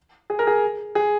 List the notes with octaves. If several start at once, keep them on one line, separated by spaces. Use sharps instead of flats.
G#4
A#4
G#4
G#4